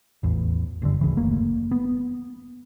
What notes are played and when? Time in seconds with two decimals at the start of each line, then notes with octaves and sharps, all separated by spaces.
0.23 A1 E2
0.82 F#1 G2 D3
1.01 D2 C#3 E3
1.16 F#1 A3 A#3
1.71 B3